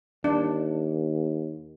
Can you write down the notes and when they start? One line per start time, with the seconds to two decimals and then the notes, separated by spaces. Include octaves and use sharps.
0.24 D#2 D4